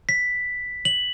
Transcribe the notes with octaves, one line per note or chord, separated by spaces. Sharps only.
B6
F#7